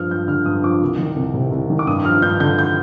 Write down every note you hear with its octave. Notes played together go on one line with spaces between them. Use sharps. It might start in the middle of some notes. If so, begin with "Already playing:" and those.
Already playing: G2 F3 D#6 F6
G2 G6
D3 F6
G2 D#6
F3 D6
C2
D#3
C2
C3
C2
D#3
D6
G2 D#6
F3 F6
G2 G6
D3 G6
G6